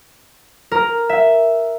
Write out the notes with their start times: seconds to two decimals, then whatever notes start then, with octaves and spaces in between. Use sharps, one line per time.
0.71 A#4
1.09 E5